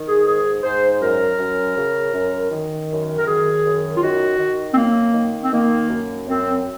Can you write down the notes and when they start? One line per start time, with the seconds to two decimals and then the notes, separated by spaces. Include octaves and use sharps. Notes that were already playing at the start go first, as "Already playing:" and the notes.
Already playing: D#3
0.08 G#4
0.26 G#2 G#4
0.63 G#2 C5
1.02 F#2 A#4
1.39 F#2
1.77 C#3
2.14 F#2
2.52 D#3
2.90 F#2
3.17 A#4
3.27 D#3 G#4
3.65 F#2
3.97 F4
4.02 D#3 F#4
4.39 D#3
4.71 C4
4.77 F#2 A#3
5.14 D#3
5.43 C4
5.52 D#3 A#3
5.90 F#2
6.27 F#2 C4